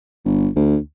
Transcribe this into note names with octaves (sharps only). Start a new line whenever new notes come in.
G1
D2